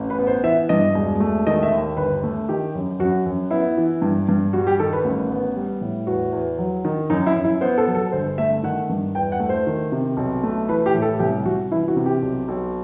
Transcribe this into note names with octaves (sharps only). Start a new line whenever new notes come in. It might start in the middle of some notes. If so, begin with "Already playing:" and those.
Already playing: A1
B4
B3
C5
E3 E5
G2 D#5
E1
A3
D#3 D#5
E5
D#2
G1 B4
A3
D#3 G4
F#2
F#2 F#4
F#2
B3 E4
E3
G2
G2
G3 F#4
G4
D#3 A4
B4
A1
B3
G3
A2
E2 F#4
E2
F#3
D#3
F#2 D#4
E4
F#2
E4
B3 C5
A4
F#3
A4
G1 C5
A3 E5
D#3 F#5
G2
E2 G5
F#5
A3
C5
D#3
C3
B1
A3
E3 B4
G4
A2
A4
C2 G4
C2 F#4
E3 E4
F#4
C3
G4
B1
B1